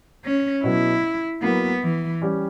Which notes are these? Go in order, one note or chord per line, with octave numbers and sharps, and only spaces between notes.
C#4
B2 F#3 B3 E4
F#3 A#3 B3 E4
E3
G3 C#4 G4